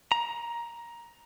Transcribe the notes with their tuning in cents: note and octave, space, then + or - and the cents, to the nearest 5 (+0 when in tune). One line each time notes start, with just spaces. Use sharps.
A#5 +15